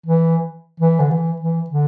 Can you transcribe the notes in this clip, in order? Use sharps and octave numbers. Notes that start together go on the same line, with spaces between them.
E3
E3
D3
E3
E3
D3